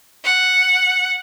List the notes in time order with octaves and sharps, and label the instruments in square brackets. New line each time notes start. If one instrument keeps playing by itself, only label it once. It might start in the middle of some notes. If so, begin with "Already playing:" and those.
[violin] F#5